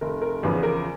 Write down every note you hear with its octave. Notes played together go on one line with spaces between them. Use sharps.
F1 A#4
A#4
E2 C#3 F3 B4
A#4